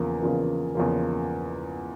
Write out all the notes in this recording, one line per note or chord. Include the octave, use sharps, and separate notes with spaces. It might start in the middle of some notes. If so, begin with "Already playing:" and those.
Already playing: E2 C#3 F3 A#3
E2 C#3 F3 A#3
E2 C#3 F3 A#3